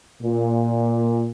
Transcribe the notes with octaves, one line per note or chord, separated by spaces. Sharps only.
A#2